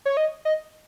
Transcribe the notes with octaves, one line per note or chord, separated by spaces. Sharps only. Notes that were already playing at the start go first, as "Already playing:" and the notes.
C#5
D#5
D#5